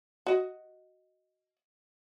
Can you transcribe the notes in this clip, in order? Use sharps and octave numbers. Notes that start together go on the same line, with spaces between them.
F#4 D#5